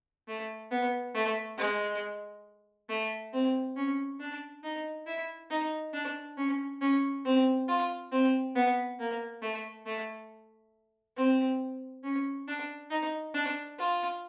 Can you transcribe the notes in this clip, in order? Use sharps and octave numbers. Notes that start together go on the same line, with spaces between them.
A3
B3
A3
G#3
A3
C4
C#4
D4
D#4
E4
D#4
D4
C#4
C#4
C4
F4
C4
B3
A#3
A3
A3
C4
C#4
D4
D#4
D4
F4